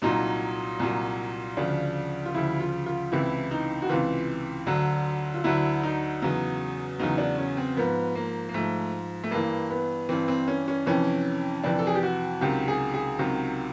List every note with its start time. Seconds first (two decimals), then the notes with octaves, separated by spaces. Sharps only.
0.02 C2 A#2 F#3 D#4
0.79 C2 A#2 F#3
1.57 D2 C#3 F3 D4
2.26 F4
2.34 D2 C#3 F3 E4
2.60 F4
2.86 F4
3.12 C#2 C3 E3 E4
3.51 D#4
3.82 F#4
3.89 C#2 C3 E3 F4
4.67 D2 D3 F#3
5.34 F4
5.44 D2 D3 F#3 E4
5.83 D#4
6.22 E2 C#3 F#3
6.99 E2 C#3 F#3 D#4
7.18 D4
7.38 C#4
7.57 C4
7.77 G#2 F3 B3
8.15 A#3
8.49 A#3
8.54 G#2 F3 A3
9.24 A3
9.31 G2 E3 A#3
9.70 B3
10.09 G2 E3 C4
10.28 C4
10.48 C#4
10.68 C#4
10.86 F2 C3 E3 C#4
11.63 F2 C3 E3 D4
11.79 A4
11.87 G#4
11.95 G4
12.03 F#4
12.41 C#2 C3 D#3 F#3 G4
12.68 G#4
12.94 G#4
13.19 C#2 C3 D#3 F#3